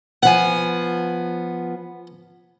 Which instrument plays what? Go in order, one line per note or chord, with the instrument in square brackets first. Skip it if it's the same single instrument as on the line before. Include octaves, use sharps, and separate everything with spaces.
[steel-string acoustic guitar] F3 B3 [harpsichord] F#5 G#5